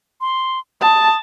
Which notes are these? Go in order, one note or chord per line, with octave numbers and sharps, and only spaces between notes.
C6
A5 D#6